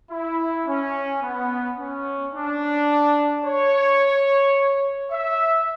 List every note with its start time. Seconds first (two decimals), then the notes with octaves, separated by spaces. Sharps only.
0.11 E4
0.67 C#4
1.22 B3
1.78 C#4
2.34 D4
3.45 C#5
5.11 E5